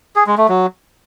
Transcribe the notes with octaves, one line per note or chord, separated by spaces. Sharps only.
G#4
G#3
A3
F#3